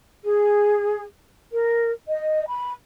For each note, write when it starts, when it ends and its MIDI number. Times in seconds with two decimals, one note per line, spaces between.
0.25 1.03 68
1.53 1.92 70
2.09 2.44 75
2.48 2.72 83